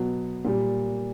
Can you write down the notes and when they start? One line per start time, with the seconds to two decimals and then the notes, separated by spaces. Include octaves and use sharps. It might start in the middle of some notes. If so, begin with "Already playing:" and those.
Already playing: B2 F#3
0.45 A#2 G3